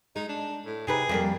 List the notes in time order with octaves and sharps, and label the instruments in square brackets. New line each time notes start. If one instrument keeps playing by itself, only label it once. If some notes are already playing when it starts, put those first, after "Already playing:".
[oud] G#3 [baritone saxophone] D#4
[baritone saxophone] D4
A2
[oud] C3 D#4 B4 [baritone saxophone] G#4
[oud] F2 G3 A#3